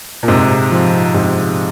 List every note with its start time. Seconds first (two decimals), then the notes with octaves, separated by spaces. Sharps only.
0.23 A#2
0.28 G#2 C3
0.71 F3 C4
1.14 G#2 C3